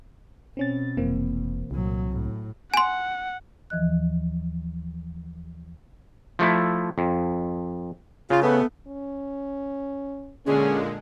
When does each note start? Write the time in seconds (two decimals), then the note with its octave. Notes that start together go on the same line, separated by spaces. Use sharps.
0.57 B2 C4 C#4 A6
0.97 F1 E3 A#3 C4
1.71 C2 A#2 F#3
2.09 A2
2.74 F#5 G#5 C6
3.70 D#2 E3 F3 D#5 F#6
6.39 F3 A3 E4
6.98 F2
8.30 C#3 F4
8.42 A3 B3
8.87 C#4
10.46 A#2 D3 G#3 C#4 G#4 A#4